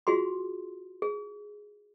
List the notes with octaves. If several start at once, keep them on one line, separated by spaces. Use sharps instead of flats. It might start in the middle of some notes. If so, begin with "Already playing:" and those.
F4 F#4 G#4 B5 C6
G#4